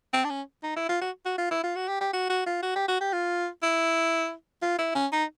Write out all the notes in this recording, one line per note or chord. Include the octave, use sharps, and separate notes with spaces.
C4
D4
C#4
D#4
E4
F4
F#4
F#4
F4
E4
F4
F#4
G4
G4
F#4
F#4
F4
F#4
G4
F#4
G4
F4
E4
F4
E4
C#4
D#4